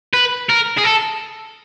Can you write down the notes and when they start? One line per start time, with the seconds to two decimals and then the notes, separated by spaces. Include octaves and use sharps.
0.13 B4
0.50 A#4
0.78 G#4
0.85 A4